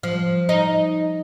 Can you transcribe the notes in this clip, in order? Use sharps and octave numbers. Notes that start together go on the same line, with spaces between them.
F3
D#4